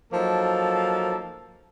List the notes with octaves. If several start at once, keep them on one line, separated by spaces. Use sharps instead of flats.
F3 F#3 A#3 D#4 A4